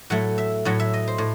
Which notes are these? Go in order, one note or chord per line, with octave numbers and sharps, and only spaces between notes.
A2 F#3 A3 F#5
E5
A2 F#3 A3 F#5
E5
D#5
C5
A2